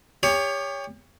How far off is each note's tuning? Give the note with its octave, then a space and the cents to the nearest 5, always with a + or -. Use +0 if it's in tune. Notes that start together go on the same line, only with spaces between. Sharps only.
G4 +40 C#5 +15